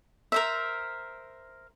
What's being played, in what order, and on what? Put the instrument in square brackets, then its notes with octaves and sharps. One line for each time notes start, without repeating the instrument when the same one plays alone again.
[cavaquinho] A#4 C5 E5